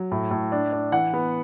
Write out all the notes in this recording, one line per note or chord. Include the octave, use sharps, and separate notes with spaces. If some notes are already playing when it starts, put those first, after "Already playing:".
Already playing: F#3
A2
A2
D4
D4
E3 F#5
B3